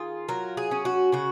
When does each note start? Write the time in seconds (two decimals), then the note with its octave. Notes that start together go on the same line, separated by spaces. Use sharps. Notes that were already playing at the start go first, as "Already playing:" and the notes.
Already playing: D#3 F4 G#4
0.29 F#3 A#4
0.57 G#4
0.71 C#4
0.85 F#4
1.12 C#3 F#4